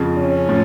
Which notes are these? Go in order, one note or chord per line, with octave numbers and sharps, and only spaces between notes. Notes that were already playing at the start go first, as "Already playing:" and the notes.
Already playing: F2 C#3 F3
C#4
A2 F3